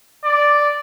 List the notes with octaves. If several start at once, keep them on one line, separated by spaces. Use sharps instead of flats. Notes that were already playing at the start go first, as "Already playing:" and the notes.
D5